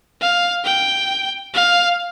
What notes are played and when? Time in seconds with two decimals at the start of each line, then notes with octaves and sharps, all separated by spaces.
0.21 F5
0.65 G5
1.54 F5